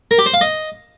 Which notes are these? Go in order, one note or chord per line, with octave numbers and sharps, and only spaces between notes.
A#4
G4
C5
F5
D#5